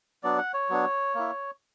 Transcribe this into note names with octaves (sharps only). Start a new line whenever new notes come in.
F#3 B3 D4 D5
F#5
C#5
F#3 B3 D4
A#3 E4